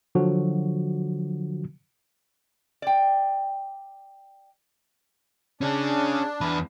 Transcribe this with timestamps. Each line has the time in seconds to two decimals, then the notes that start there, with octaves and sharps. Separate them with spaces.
0.15 D3 F3 F#3 F#4
2.82 D5 G5
5.61 C#4 D4 G#4
6.41 E2 B4